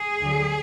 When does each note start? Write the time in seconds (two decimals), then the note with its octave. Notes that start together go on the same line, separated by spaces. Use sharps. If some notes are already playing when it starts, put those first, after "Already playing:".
Already playing: G#4
0.21 D2 D3 F#3